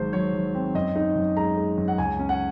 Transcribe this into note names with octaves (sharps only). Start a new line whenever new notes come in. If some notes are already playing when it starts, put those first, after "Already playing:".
Already playing: G#1 G#2 F#3 C5
F#3 C#5
F#3
C4
F#2 D#5
D#4
F#2
G#3 A#5
G#3
F#2
F#5
C#2 G#5
C#4
F#5